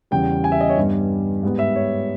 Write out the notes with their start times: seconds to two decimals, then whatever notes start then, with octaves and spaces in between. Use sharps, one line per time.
0.11 E2 C#3 G3 G5
0.44 G#5
0.52 E5
0.61 D#5
0.69 C#5
0.76 G2 G3 B3
1.43 G#2 G3 B3
1.59 E5
1.76 C#5